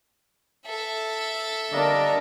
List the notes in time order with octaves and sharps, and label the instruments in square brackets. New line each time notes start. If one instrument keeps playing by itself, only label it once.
[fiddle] A4 E5
[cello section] D3 A#4 [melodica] G3 A#3 D#5 [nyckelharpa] D4